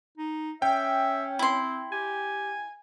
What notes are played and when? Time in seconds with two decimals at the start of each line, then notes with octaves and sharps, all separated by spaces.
0.18 D#4
0.62 C#4 E5 G5
1.39 C4 E4 C6
1.92 G4 G#5